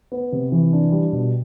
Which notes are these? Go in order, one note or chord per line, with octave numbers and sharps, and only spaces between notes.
B3
C3
E3
D4
G3
B2